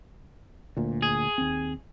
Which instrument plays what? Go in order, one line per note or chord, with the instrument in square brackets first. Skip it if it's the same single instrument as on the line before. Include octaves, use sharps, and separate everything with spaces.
[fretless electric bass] D2 A#2
[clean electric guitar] G#4
[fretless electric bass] D#2 C4